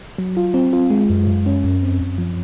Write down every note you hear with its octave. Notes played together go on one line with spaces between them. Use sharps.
F#3
F4
C4
F4
G#3
F#2
F#2
C#4
F#2
C4
F#2
F3